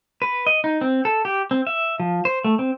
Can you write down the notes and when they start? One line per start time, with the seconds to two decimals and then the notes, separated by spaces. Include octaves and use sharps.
0.22 B4
0.47 D#5
0.64 D#4
0.81 C4
1.05 A4
1.25 G4
1.51 C4
1.67 E5
2.00 F3
2.25 C5
2.45 A3
2.59 C4